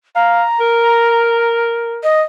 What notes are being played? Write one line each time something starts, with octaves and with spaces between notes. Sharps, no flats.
F5 A#5
A#4
D#5